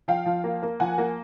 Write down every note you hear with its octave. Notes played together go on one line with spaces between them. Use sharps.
F3 F5 G5
F3
A#3
A#3
F3 F#5 G#5
A#3